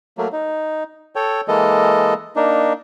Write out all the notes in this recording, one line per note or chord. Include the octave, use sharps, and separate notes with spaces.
F#3 A3 A#3
D#4
A4 C#5 G5
E3 G#3 A#3 A4 D#5
A#3 D4 D#4